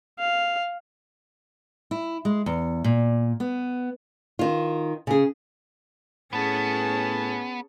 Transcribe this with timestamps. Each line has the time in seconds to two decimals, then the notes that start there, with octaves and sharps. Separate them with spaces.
0.19 F5
1.91 E4
2.25 G#3
2.46 E2
2.84 A#2
3.40 B3
4.39 D#3 F4
5.07 C#3 G#4
6.33 A2 B3 C#4 G#4 A5